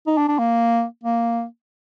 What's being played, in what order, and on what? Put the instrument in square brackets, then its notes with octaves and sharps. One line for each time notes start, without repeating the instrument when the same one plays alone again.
[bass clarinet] D#4
D4
D4
A#3
A#3